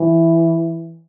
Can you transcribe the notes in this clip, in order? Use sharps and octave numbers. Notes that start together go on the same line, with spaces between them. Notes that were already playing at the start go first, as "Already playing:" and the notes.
Already playing: E3